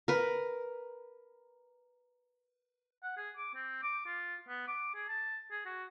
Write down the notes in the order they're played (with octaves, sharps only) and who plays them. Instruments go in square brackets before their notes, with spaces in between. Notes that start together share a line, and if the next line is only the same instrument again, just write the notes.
[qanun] A#4 B4
[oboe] F#5
G#4
D6
C4
D6
F4
B3
D6
G#4
A5
G#4
F#4